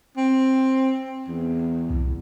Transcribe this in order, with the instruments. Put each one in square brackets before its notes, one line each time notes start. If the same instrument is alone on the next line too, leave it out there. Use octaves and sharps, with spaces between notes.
[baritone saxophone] C4
E2
[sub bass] C2